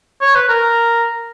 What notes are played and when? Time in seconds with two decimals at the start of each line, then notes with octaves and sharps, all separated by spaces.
0.21 C#5
0.35 B4
0.49 A#4